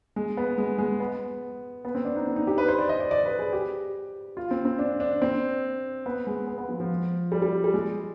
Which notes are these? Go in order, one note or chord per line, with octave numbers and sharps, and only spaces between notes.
G#3
B3
G#3
G#3
B3
B3
C4
D4
D#4
C4
D#4
G4
B4
C5
D5
D#5
D5
D5
B4
G#4
G4
F4
C4
C4
D4
D4
C4
B3
G#3
B3
B3
F3
F3
G3
G3
G3
G#3